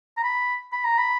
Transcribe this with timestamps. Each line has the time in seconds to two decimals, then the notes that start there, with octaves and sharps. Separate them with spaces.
0.17 A#5
0.24 B5
0.72 B5
0.85 A#5
0.98 B5